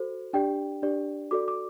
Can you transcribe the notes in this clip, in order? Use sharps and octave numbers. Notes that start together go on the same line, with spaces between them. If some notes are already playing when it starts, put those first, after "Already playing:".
Already playing: F#4 A4 C5
D4 G4 D5 G5
D4 G4 D5
F#4 A4 D5 D6
D6